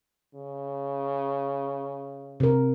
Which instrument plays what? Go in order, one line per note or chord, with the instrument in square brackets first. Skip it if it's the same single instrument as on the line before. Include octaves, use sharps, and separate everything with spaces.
[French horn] C#3
[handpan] C3 A#4